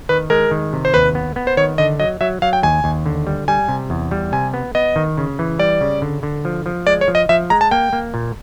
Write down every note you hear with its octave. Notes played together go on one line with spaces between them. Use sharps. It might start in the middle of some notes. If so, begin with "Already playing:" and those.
D#3 B4
G#3 A#4
D#3
C3
C5
D#2 B4
B3
B3
C5
D#3 C#5
D3 D#5
F#3 D#5
F#3 E5
F#3 F5
G5
D#2 G#5
D#2
D3
G3
G3 G#5
C3
E2
G3
C3 G#5
B3
B3 D#5
D#3
C#3
E3
G3 D5
C#3
D3
D3
F3
F3
G#3 D5
C#5
F3
D#5
F3 E5
G#3 A#5
A5
A#3 G5
A#3
A#2